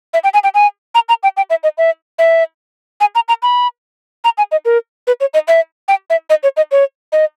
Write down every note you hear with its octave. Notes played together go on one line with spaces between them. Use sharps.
E5
G5
G#5
G5
G#5
A#5
A#5
G5
G5
E5
D#5
E5
E5
G#5
A#5
A#5
B5
A#5
G#5
D#5
A#4
B4
C#5
D#5
E5
G5
E5
D#5
C#5
D#5
C#5
D#5